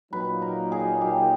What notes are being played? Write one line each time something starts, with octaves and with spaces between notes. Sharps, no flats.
A#2 F#3 A#3 D#4 B4
A#4
G#4
G4